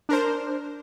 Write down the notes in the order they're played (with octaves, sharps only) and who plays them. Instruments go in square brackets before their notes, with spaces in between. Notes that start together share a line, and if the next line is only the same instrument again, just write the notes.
[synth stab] D4 A#4 C5